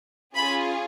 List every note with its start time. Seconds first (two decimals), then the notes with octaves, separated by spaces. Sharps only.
0.35 C#4 F4 G#4 B5